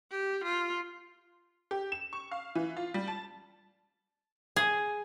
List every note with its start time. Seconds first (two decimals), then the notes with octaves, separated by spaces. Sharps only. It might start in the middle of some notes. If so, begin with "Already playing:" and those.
0.11 G4
0.44 F4
1.71 G4
1.92 E7
2.13 C#6
2.31 F5
2.55 E3
2.77 F4
2.94 G3
3.08 A5
4.56 G#4